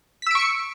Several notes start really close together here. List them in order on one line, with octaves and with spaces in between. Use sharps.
B6 E6 D7 C#6 C#7